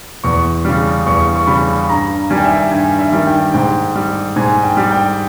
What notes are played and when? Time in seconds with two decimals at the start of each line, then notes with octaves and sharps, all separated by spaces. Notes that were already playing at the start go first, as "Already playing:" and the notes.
0.24 E2 C#6
0.65 C#3 G3
1.06 E2 C#6
1.36 C#6
1.47 C#3 G3 B5
1.89 G2 A#5
2.30 D#3 G3 G#5
2.37 G5
2.45 E5
2.51 G5
2.71 G2 G#5
2.99 E5
3.12 D#3 G3
3.27 G5
3.53 G#2 G5
3.96 G3
4.36 G#2 G#5
4.64 G5
4.77 G3
4.91 G5